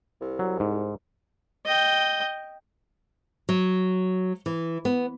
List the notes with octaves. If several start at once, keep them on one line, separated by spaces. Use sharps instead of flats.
C2
F#3
G#2
D#5 G5
F#3
E3
B3